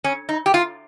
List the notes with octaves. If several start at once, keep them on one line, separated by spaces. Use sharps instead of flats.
C#4
D#4
G4
F4